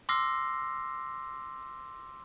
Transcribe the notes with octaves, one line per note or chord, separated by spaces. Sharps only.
C6 D6 E6 F6 A#6 C7